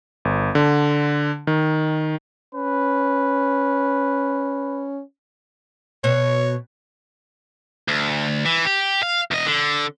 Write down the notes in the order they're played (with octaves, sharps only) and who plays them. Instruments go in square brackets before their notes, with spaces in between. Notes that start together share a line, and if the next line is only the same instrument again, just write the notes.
[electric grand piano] G1
D3
D#3
[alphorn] C#4 [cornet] B4
[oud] B2 [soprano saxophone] C#5
[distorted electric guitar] D2
E3
G4
F5
E2 D#5
D3